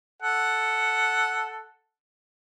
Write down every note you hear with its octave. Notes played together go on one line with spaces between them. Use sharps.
A4 F#5